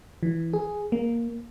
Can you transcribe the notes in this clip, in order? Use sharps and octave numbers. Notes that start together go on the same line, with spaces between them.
E3
G#4
A#3